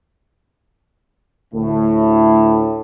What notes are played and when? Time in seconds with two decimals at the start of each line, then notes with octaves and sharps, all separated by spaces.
1.53 D2 A2